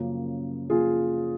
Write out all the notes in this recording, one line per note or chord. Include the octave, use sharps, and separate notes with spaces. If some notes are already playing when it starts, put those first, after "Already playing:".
Already playing: F#2 C#3 F3 A#3
C#3 F3 A#3 F4 G#4